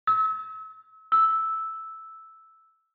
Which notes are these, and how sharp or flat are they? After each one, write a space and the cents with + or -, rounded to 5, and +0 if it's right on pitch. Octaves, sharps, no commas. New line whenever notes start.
E6 -35
E6 -5